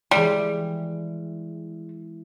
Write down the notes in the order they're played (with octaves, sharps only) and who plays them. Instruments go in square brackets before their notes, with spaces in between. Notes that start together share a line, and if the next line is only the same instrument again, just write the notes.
[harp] E3 G#3 [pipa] G3